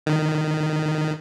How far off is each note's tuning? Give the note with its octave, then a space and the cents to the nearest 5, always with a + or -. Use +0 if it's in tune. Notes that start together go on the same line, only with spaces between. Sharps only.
D#3 -10